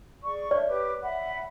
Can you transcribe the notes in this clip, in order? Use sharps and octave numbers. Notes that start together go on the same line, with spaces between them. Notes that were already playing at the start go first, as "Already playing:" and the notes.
G#4 D5 C#6
D4 C#5 D5 E5
G4 B4 D6
E5 F#5 B5